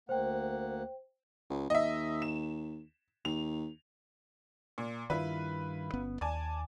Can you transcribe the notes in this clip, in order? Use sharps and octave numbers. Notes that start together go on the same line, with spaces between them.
D2 A#3 C5 F#5 G5
C#2
D#2 D#5 E5
E7
D#2 F7
A#2
G2 D#3 E4 F4 B4
G1 B3 C#4
D#2 D5 G#5 A5